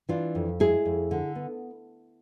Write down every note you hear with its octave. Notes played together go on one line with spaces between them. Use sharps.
E3 D4 F4
F2
G#3 E4 G#4
F2
D3
B3